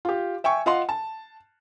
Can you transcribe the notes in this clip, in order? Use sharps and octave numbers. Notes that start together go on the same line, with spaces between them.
F4 G4
E5 G5 G#5 C#6
F4 D#5 F5 F#5 C6
A5